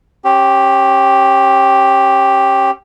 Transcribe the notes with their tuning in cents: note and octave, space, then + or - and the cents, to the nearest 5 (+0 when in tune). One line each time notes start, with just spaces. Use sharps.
C#4 -30 G4 +0